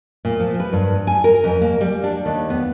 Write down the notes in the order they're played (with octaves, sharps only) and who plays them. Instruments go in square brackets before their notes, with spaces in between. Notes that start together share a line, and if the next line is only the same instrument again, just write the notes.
[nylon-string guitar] A#2
F3
B4
G2
G#5
A#4
F2
A#3
G3
D4
D#2
B3